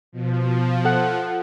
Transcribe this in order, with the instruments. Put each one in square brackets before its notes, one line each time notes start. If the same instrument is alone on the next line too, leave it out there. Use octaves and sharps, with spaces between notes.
[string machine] B2 [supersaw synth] F3
[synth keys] A4 F#5